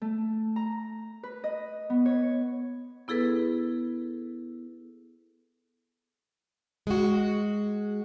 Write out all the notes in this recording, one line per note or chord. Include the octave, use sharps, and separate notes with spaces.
A3
A#5
B4
D#5
B3
C#5
B3 E4 G#4 A4 B4
G#3 F#4